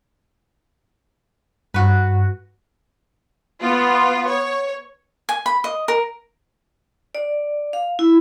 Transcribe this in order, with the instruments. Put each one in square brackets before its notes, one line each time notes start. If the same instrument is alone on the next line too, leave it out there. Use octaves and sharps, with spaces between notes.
[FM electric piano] G2 [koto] F#4 B4
[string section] B3 F4
C#5
[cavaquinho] G#5
B5
D#5
A#4
[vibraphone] D5
F5
E4